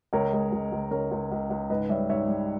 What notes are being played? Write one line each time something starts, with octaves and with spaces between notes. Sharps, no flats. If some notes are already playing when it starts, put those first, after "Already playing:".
C#2 A#4 C#5
G#3
C#2
C#2
C#3 A#4 C#5
C#2
C#2
C#2
G#2 B4 D#5
G3 C#5 E5
G#2 C#5 E5
G3